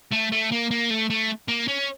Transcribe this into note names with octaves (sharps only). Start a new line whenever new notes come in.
A3
A3
A#3
A#3
A3
A3
A#3
C#4